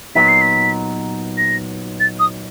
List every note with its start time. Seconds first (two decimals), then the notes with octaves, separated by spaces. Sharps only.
0.15 A#2 F#3 B3 D#4 B6
0.28 C7
0.41 B6
1.38 A#6
2.00 A6
2.20 D#6